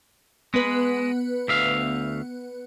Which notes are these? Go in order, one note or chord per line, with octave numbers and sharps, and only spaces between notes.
G#3 B3 B4
D2 E5 F5